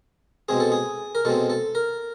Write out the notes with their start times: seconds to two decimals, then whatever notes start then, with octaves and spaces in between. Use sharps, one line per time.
0.49 B2 G#3 C4 G#4
0.60 A4
0.72 G#4
1.15 A#4
1.25 B2 G#3 C4 A4
1.50 A4
1.75 A#4